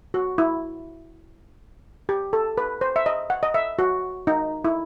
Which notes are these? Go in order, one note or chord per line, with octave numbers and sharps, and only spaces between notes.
F#4
E4
G4
A4
B4
C5
E5
D#5
F#5
D#5
E5
F#4
D#4
E4